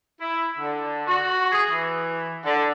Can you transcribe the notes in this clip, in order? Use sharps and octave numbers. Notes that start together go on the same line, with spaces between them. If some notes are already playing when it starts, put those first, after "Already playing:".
E4
D3
F#4
G#4
E3
D3